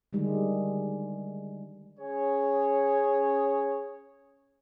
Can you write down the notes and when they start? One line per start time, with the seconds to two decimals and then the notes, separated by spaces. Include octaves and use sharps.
0.13 D3 D#3 G3 G#3
1.99 C#4 G#4 C#5